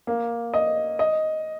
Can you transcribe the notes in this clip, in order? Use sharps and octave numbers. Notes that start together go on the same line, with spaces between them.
A#3
D#5
D#5